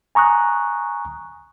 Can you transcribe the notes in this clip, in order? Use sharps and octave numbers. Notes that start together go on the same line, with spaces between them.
G#5 A#5 C#6 D#6 F#6